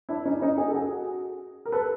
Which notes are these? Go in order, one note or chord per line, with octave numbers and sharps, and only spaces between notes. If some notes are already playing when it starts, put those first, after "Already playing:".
D4 E4
C#4 D#4
C#4 D#4
F#4 G#4
A4
F#4 G#4
A#4
A4 B4